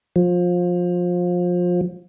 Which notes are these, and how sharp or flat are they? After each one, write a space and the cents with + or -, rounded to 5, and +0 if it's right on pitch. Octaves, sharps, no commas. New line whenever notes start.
F3 +25